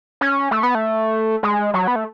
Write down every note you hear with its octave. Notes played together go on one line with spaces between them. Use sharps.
C#4
A3
B3
A3
G#3
F#3
B3
A3